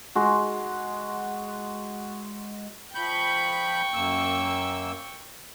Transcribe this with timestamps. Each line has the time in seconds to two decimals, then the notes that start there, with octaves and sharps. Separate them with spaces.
0.15 G#3 F#4
2.95 F3 G5 B5 C#6 G6
3.94 F#2 A#3 E6